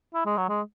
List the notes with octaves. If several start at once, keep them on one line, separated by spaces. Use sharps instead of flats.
E4
G#3
F#3
G#3